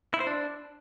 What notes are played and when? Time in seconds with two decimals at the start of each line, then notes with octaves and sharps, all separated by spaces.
0.14 E4
0.20 C5
0.27 D4